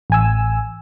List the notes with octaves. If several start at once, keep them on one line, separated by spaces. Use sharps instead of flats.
A1 G#5 E6